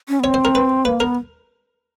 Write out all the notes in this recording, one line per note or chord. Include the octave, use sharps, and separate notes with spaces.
C#4
B3
C4 C#5
C5
A#4
B4
A#3 B4
B3 A#4